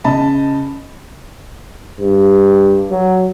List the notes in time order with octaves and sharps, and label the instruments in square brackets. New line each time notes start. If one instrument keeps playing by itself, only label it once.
[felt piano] C#3 D#5 A5 B5
[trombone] G2
F#3